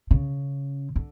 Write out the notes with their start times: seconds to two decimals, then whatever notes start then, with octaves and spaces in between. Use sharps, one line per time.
0.11 C#3
0.96 D3